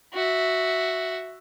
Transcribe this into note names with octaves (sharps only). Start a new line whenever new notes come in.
F#4 E5